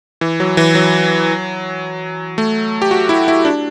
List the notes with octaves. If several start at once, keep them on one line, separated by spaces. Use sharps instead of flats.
E3
F#3
E3
F#3
A3
G4
F#4
E4
E4
D4